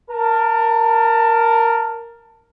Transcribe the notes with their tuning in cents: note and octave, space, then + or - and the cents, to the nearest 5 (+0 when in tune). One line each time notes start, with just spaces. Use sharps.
A#4 +0 A5 +20